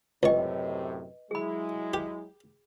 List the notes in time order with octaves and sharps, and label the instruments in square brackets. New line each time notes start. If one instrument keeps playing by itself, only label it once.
[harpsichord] C#2 C#6 [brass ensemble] F#2 A2 C3 [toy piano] B4 D#5 G5
[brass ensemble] F#3 G#3 E4 [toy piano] G#4 B5
[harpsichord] G4